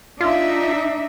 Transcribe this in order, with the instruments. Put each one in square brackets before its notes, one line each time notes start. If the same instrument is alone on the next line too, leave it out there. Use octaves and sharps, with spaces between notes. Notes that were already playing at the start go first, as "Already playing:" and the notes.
[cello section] D4 D#4 E5 [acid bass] F4